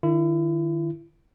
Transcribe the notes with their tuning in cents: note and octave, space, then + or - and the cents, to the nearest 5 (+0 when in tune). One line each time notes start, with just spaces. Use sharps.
D#3 -25 E4 +35